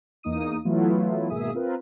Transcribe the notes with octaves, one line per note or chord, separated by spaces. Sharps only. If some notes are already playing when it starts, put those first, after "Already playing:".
E2 A#3 D#4 D#6 D#7
E3 F#3 A3 B3 E4 F4
G#1 B2 A#3 G#4 E5 D#6
C4 F4 A#4 B4